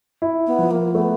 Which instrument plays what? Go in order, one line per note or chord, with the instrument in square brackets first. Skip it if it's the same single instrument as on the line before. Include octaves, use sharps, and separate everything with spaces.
[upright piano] E4
[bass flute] B3
[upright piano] F3
[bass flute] A#3
[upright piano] A3 [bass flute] B3